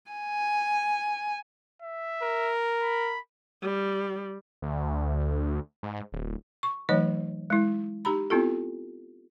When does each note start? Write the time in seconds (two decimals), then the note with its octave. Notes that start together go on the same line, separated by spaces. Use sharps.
0.11 G#5
1.82 E5
2.22 A#4
2.82 B5
3.62 G3
4.62 D2
5.83 G#2
6.13 D1
6.63 C#6
6.89 E3 F#3 A3 D#4 C#5 D#5
7.50 G#3 E4
8.05 D#4 G4 A#5 B5
8.30 B3 C4 E4 F4 G4 A4